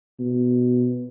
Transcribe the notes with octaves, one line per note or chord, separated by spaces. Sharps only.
B2